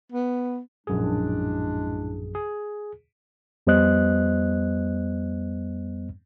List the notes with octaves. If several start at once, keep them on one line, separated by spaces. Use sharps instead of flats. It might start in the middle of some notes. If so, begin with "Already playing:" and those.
B3
A#1 F#2 A2 G#3 D4 G#4
G#4
F2 G3 B3 C5 D#5 F#6